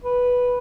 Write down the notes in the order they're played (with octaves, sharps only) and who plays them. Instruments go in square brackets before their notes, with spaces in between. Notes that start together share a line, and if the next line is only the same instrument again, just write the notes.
[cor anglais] B4